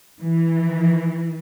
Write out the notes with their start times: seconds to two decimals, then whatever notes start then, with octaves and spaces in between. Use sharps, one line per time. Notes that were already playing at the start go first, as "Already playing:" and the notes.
0.22 E3